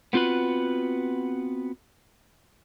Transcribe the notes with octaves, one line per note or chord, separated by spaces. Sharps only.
B3 C4 F4 F#4 B4